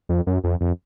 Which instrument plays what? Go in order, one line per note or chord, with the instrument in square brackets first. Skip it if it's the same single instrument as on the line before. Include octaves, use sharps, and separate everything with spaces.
[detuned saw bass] F2
F#2
F2
F2